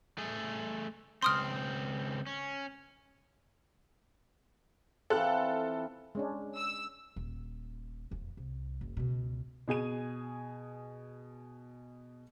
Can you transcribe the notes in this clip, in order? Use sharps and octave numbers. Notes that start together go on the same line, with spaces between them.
A3 G#4
C#2 C4 C6 D#6 F6
C#4
E3 C4 F4 A4 F#6
G#3 C#4 D4
E6
D#1
D#1 F2
C2
F#1
C#2 B2
B2 G#4 G#5 D#7